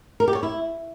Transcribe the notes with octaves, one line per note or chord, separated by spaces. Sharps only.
A#4
G4
C#5
E4